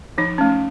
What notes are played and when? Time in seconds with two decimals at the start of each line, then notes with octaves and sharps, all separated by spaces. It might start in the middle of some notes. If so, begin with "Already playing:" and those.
0.18 F3 D#4
0.38 A3 C#4